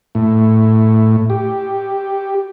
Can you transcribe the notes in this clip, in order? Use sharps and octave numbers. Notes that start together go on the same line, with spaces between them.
A2
G4